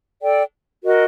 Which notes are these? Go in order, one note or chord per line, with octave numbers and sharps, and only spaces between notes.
A4 D5 G5
F#4 A#4 D#5